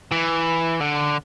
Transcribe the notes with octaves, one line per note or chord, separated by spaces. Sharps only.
E3
D3